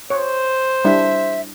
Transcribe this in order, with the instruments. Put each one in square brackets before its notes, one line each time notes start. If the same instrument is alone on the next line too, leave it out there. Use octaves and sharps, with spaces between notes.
[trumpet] C5 [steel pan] C#5
[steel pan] G3 D4 E4 [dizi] E5